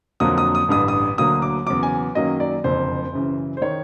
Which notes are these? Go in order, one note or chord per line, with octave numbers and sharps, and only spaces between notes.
F2 D3 F#3 A#3 D#6
D#6
D#6
A1 G2 D3 D#6
D#6
D2 D3 F#3 A#3 D#6
D6
E2 C#3 F#3 D6
G#5
F#2 D#3 F#3 A#3 C#4 D#5
D5
F#1 F2 D3 C5
F#2 C#3 E3
C5
D#3 C#5